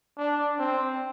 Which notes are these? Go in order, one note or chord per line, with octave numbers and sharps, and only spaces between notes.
D4
C4